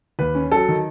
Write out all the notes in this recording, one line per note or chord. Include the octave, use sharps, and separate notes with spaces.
D#2 B4
C#4
F#3 A4
D#3